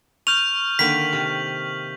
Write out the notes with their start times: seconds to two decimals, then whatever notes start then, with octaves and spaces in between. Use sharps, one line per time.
0.27 C#6 F6 G6 F7
0.79 D3 D#3 A#3 G6 B6 F#7
1.13 C3